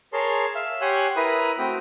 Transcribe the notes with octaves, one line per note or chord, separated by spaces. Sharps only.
G#4 A#4 C#5 A5 C6
E5 F5
G4 C#5 F#5 G#5 C6 F#6
E4 A#4 B4 B5 D#6
A3 C4 F#4 G5 D#6